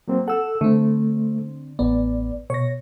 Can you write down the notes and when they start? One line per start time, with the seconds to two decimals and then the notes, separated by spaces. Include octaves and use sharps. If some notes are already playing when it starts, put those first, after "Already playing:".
0.08 F#3 A#3 C4
0.28 A4 F#5 E6
0.61 D3 A3 C4
1.79 A1 B3 D5
2.50 B2 C#5 A#6